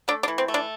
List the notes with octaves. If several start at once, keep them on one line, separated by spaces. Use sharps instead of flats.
A3 D4
D4
E3
C4
A3
D4